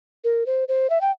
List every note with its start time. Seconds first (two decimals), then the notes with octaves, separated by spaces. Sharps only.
0.24 A#4
0.46 C5
0.68 C5
0.90 E5
1.01 G5